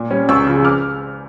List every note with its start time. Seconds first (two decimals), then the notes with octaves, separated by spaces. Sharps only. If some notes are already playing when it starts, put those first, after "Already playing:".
Already playing: A#2
0.11 G3 C#4
0.29 C#2 C#6 E6
0.47 C#3 F3
0.65 D6 F6